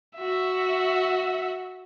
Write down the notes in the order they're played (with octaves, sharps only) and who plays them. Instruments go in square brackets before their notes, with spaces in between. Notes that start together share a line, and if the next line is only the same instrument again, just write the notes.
[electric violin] F#4 E5